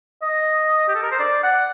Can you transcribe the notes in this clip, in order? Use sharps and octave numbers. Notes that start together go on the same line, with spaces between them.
D#5
G4
A4
A#4
C5
D5
F#5